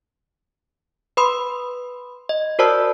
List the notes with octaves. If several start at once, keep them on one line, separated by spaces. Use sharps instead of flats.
B4 B5 C6 D#6
D#5
F#4 A#4 C5 D5 A5 E6